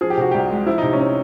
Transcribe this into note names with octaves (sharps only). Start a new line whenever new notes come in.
F3 G#4
G4
C3 F#4
C2 G4
G#3
F3 E4
C3 D#4
C#4
C4